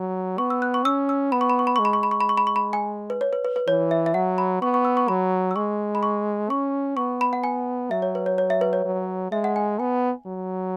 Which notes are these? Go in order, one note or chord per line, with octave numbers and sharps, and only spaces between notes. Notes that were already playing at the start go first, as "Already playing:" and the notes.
Already playing: F#3
B3 C#6
E6
F#6
C#6
C#4 E6
E6
B3 B5
C#6
B5
C#6
B5
G#3 C#6
B5
C#6
B5
C#6
B5
C#6
B5
C#6
B5
G#5
B4
C#5
B4
B4
B4
E3 C#5
E5
E5
F#3 F#5
B5
B3 C#6
C#6
E6
C#6
F#3 B5
E6
G#3 C#6
B5
C#6
C#4 C#6
B3 C#6
B5
F#5
G#5
F#3 E5
C#5
B4
C#5
C#5
E5
B4
C#5
F#3
G#3 E5
F#5
G#5
B3 G#5
F#3